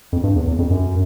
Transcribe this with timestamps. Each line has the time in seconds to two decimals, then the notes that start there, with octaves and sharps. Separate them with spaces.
0.13 F2
0.24 G2
0.36 E2
0.47 E2
0.59 F2
0.71 F#2